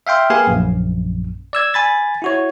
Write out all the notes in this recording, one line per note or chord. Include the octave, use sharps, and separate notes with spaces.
E5 F5 G5 C6
A#3 G4 G#4 B4 F5 G#5
A#1 F#2
D5 E6 G#6
G#5 B5 A6
E4 F#4 C#5